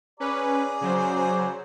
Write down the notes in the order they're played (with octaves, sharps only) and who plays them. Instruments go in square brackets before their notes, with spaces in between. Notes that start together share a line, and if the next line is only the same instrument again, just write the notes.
[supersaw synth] C#4 B4 [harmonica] G#4 D5 A#5
[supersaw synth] C#3 F#3 C5